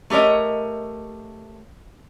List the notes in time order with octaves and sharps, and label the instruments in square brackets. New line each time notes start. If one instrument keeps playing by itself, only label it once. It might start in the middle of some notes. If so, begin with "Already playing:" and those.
[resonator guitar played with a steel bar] A3 G4 A#4 C#5 D#5